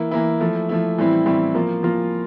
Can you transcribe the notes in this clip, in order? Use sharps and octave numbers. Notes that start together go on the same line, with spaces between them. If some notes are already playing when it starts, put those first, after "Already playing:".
Already playing: E3 A#3 E4
E3 A#3 E4
F3 A3 E4
F3 A3 E4
A2 E3 G3 C4 E4
A2 E3 G3 C4 E4
F3 A#3 F4
F3 A#3 F4